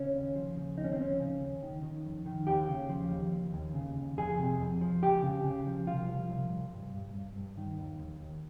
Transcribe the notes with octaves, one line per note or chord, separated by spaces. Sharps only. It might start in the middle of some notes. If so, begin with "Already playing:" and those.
Already playing: C#3 C#4
D#2
F3
C#3
D#2 D#4
C#4
C4
F3 C#4
C#3
D#2
D#3
D#3
F2
D#3
D#2 G4
C#3
F3
D#2
D#2
D#2
C#3
D#2
F2 G#4
C3
F2
F3
C#2 G4
C#3
C#3
F3
C2 F4
F3
C2
C2
G2
G2
G2
G2
D#3
D#2
D#2
D#2